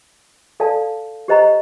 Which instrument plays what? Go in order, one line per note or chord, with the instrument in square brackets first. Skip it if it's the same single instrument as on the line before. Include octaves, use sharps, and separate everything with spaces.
[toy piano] A4 D5 F5 A5
G4 C5 D#5 A#5